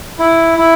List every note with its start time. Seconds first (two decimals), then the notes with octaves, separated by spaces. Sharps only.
0.19 E4
0.58 E4